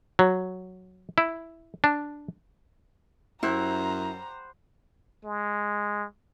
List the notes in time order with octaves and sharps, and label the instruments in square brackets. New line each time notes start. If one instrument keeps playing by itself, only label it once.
[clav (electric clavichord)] F#3
E4
D4
[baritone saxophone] F#2 [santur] G3 C5 F#5 [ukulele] E4 [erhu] A#5
[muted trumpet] G#3